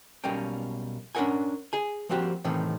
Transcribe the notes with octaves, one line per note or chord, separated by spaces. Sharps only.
B1 B2 G3 A#3 C#4 G5
C#4 D4 F4 A#4 F#5 G#5
G#4 G#5
F3 A#3 C4 F#4 G4
A2 C3 D#3 E3